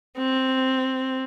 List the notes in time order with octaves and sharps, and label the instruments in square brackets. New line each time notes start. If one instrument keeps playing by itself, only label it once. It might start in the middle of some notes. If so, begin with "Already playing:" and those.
[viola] C4